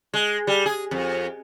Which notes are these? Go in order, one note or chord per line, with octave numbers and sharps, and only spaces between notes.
G#3
G3
G#4
F2